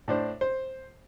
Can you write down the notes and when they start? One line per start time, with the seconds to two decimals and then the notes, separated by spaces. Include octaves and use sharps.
0.08 A2 D4 C5
0.41 C5